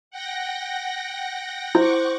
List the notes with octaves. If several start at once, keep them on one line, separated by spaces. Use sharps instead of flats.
F#5 G5 A#6
E4 C5 F#5 C#6 D6